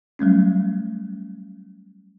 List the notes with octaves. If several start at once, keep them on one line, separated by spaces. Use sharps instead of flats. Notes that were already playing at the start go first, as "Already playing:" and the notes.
F#3 G3 A3 C#4